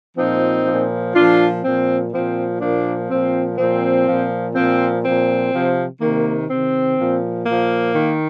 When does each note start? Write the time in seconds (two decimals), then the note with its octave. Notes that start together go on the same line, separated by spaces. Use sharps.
0.17 A#2 F3 C4 D#4
0.66 A#2 F3
1.15 A#2 F3 D4 F4
1.64 A#2 F3 C4
2.12 A#2 F3 C4
2.61 A#2 F3 A#3 D4
3.10 A#2 F3 C4
3.58 A#2 F3 C4
4.07 A#2 F3
4.55 A#2 F3 C4
5.03 A#2 F3 C4
5.53 C3 F3
6.01 C3 D#3 A#3
6.50 C3 D#3 C4
6.98 A#2 F3
7.46 A#2 F3 A#3
7.95 D#3